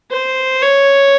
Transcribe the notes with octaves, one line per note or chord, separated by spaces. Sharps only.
C5
C#5